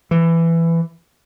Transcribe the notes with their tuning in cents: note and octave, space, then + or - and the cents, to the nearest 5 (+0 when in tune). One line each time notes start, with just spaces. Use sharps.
E3 +15